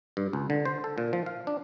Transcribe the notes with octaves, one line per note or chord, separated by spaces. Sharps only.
G2
C#2
D3
C5
A4
A#2
F3
F5
D4